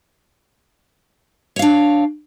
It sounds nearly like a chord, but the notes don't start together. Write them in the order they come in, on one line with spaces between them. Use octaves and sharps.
C#5 F5 D4